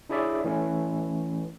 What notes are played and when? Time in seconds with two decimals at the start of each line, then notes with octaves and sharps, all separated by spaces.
0.09 D4 E4 G#4 C#5 D5 E5
0.44 E3 A3 C#4